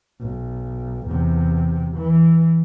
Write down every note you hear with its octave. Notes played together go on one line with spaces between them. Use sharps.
B1
E2 C3
E3